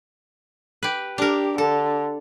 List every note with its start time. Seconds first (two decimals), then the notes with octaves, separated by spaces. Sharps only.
0.83 G4 B4
1.18 D4 G4 A#4
1.58 D3 A4